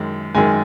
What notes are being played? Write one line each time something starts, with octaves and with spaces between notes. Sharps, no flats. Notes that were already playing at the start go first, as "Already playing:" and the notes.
Already playing: F#2 D#3 G#3
F#2 D#3 G#3 G#5